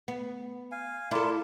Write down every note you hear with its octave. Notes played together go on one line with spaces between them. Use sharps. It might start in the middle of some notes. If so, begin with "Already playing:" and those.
B3
F5 G#5
E4 F4 A4 A#4 D5